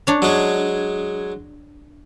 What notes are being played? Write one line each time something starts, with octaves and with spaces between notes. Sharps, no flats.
D4 C#5
F#3 G#3 G#4